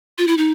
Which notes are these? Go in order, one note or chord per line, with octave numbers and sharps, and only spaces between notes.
F4
E4
D#4